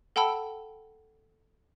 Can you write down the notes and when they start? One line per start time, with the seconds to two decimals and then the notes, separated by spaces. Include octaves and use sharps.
0.16 A4 F#5 G5 A5 B5 E6